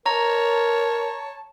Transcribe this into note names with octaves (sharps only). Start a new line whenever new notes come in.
A#4 C#5 A5 A#5